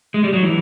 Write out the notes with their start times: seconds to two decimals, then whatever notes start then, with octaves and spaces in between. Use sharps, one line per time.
0.14 G#3
0.24 G3
0.33 F#3
0.43 E3